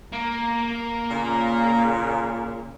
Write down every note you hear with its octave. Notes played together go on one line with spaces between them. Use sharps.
A#3
A#2 C#3